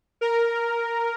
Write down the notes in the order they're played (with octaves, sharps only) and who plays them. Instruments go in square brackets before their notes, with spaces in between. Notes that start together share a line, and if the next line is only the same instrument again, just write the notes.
[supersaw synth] A#4